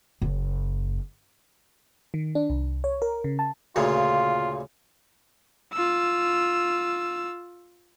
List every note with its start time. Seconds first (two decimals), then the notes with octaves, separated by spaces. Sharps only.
0.22 F#1
2.14 D#3
2.35 D4
2.50 C2
2.84 C#5
3.02 A#4
3.24 C#3
3.39 A5
3.76 D2 A#2 C#3 F4
5.73 F4 E6